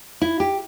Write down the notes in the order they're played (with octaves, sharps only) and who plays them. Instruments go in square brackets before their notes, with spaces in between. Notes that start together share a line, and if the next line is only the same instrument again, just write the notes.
[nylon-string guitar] E4
G4